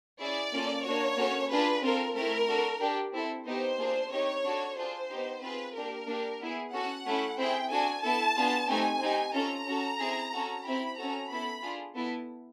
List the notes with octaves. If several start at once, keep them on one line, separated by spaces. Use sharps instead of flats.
C#4 E4 G#4 D5
A#3 C#4 F4 A4
A#3 D4 F#4 C#5
A#3 C#4 F#4 A4
D4 F4 G#4 B4
C4 F4 A4 A#4
A3 C4 E4 A#4
D4 F#4 A4
D4 G4
C4 E4 A4
B3 D#4 G4 C5
A#3 D4 F4 G#4
C4 D#4 G4 C#5
D4 F#4 A4
D4 F4 G#4 C5
B3 D#4 G4
C4 F4 G#4 B4
A#3 D4 G4 A#4
A#3 D4 G4
B3 E4 G#4
C#4 F#4 A4 F#5
A3 C#4 E4
C4 E4 G#4 G5
D4 F#4 A4 G#5
B3 E4 A4 A5
B3 D4 F4 G#4
A3 C4 D#4 G4 G#5
C4 D#4 G4
C#4 F4 A4 A#5
C#4 F#4 A4
C4 E4 G#4
C#4 F#4 A4
C4 E4 G4 B5
C#4 F#4 A4 A#5
B3 E4 A4 B5
D4 F4 G#4
B3 E4 A4